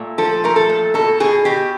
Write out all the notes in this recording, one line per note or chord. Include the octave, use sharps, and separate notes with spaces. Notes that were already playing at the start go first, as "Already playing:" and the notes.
Already playing: A#2 A3
F3 A4
A3 A#4
A4
A#2
B2 A4
B2 G#4
B2 G4